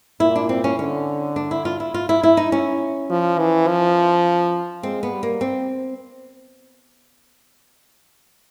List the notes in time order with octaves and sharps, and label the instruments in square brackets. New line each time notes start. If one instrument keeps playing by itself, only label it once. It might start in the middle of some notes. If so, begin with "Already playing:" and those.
[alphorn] A#2 [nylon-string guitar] E4
[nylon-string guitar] D4
C4
C#4
[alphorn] D3 [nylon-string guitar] C#4
[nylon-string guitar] D4
E4
F4
E4
F4
E4
E4
D#4
C#4
[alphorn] F3
E3
F3
[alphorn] G#3 [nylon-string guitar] C4
[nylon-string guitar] B3
[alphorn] G3
[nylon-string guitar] A#3
C4